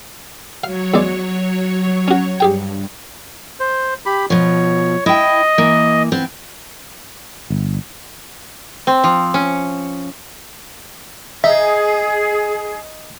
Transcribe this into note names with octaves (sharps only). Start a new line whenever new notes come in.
F#3 C#5 F5
E2 G#3 D5
C#4 F#4
G2 G4 G#4 G5
C5
G4 B5
B2 F3 C#5
E4 D#5 G5
E3 A#3
B3 C4
G1
C4
F3
C#4
D#4 G#4 E5